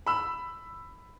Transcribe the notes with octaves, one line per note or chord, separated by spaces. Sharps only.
B5 E6